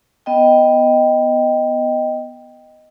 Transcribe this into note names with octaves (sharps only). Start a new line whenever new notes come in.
B3 D#5 G5